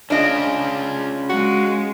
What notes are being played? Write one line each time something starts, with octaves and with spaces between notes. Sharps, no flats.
C#4 D4 F4 G#4 D#5
G#3 F#4